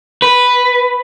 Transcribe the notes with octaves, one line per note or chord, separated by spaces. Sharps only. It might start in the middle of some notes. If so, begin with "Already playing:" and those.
B4